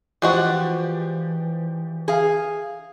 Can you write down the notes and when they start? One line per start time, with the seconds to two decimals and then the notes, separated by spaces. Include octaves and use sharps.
0.22 E3 F3 G#3 D4 F#4 G4
2.08 G#4 F5